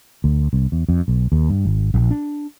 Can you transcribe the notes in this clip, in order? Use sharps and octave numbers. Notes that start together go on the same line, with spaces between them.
D2
C2
E2
F2
B1
D#2
G2
G#1
A#1
D4